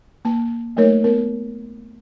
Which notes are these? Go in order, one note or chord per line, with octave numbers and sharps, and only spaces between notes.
A#3 A5
F#3 A3 A#3 D#4 A#4 C#5
B3 A#4